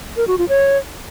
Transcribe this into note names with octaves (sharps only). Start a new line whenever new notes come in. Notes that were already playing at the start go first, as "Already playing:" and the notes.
A#4
F#4
F4
C#5